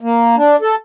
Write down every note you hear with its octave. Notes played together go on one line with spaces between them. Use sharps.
A#3
D4
A4